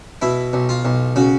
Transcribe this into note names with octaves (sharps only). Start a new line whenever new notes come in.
B2 E4
B1
F4
B1
C#3 F#4